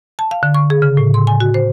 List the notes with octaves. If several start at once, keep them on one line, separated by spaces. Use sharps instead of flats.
A5
F5
D3
C#6
G#4
C#3
A2
C6
G#5
F#4
C5